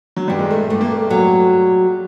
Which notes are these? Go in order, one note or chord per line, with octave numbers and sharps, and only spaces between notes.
F#3
G2 G3
G#3
A3
G2 A3
A#3
A3
F#3 A3